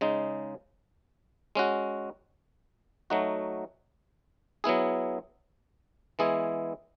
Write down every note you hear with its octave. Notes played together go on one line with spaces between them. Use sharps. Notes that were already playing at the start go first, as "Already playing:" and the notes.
C#3 G#3 D#4
G#3 C#4 F#4
F#3 A3 D#4 F#4
F#3 B3 E4 G#4
E3 G#3 B3 E4 G#4